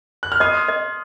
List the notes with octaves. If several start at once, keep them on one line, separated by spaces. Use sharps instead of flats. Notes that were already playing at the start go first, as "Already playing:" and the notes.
F#6
F6
D#5 C6 D#6
D#5